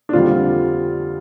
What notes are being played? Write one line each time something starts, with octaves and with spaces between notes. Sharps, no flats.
D4
F2 D3 G3 F4